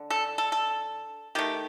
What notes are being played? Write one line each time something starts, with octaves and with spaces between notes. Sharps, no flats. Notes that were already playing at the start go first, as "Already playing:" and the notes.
Already playing: D3
A4
A4
A4
D#3 A3 G4